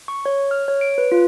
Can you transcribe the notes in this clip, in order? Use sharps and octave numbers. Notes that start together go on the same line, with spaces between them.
C#6
C#5
F6
C#5
D7
B4
F4